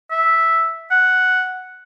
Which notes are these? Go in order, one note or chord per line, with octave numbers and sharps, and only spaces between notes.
E5
F#5